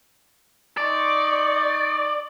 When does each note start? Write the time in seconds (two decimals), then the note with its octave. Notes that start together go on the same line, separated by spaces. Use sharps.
0.77 D#4 D5 C6 C#6